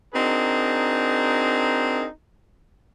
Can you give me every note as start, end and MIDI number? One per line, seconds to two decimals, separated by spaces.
0.15 2.07 60
0.15 2.07 62
0.15 2.07 63
0.15 2.07 66
0.15 2.07 68
0.15 2.07 70